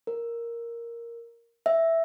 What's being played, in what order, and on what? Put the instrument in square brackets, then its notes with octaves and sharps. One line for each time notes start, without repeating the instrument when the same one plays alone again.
[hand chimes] A#4
E5